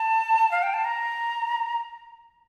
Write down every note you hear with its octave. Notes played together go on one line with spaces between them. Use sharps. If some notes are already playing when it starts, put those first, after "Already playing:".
Already playing: A5
F5
G5
A5
A#5